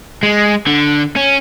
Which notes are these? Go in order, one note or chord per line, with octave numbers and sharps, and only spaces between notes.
G#3
D3
C#4